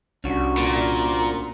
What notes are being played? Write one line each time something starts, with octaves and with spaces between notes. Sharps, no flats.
C2 C#4 D4 F#4
A#2